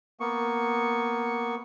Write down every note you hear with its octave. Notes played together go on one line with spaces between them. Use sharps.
A#3 B3 C#6